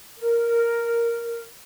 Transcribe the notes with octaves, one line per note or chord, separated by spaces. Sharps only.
A#4